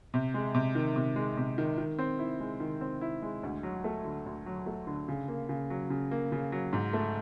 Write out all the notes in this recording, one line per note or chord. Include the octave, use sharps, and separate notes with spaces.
C3
G#3
C3
D#3
C3
G#3
C3
D#3
D#3
C4
E4
G#3
D#3
C4
E4
G#3
D2
F#3
A3
D3
D2
F#3
A3
D3
C#3
A#3
C#3
F#3
C#3
A#3
C#3
F#3
G#2
A3